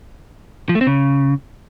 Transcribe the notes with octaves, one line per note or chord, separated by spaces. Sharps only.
F3
A3
C4
C#3